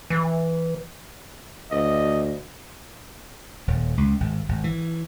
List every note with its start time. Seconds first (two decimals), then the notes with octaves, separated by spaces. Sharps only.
0.10 E3
1.71 D2 D#5
3.68 D#1
3.97 C#2
4.20 G#1
4.49 G#1
4.64 E3